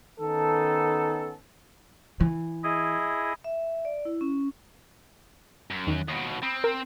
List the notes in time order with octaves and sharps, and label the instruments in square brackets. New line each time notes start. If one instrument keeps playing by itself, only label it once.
[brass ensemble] D#3 B3 C#4 D#4 A4
[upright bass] E3
[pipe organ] E4 G#4 D#5
[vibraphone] E5
D5
E4
C#4
[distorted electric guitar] F#2
[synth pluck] E2 D#3 F#6
[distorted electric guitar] D#2 B2 [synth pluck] D#6 A#6 C#7
[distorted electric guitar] C4 [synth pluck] B5 D#6
[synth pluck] A#4